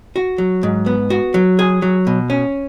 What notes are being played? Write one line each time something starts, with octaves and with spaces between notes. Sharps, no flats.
F#4
F#3
G#2
B3
F#4
F#3
G#4
F#3
B2
C#4